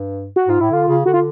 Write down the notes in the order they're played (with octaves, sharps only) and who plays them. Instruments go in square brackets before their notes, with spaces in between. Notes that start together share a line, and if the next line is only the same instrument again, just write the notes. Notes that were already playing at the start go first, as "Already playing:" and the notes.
Already playing: [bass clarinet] G2
[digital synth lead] F#4
[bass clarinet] G#2 [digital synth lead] F4
[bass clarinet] A2 [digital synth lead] E4
[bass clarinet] D3 [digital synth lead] F4
[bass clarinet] C#3
[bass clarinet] D3 [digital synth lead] F#4
[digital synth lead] F4